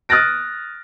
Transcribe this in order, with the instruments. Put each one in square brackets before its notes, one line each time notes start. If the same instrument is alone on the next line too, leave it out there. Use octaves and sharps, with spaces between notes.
[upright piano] D#6 F6 F#6 A6 A#6 D7